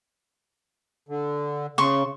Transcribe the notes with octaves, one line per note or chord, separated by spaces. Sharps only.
D3
C#3 C6 C#6